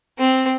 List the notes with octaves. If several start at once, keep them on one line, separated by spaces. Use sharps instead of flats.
C4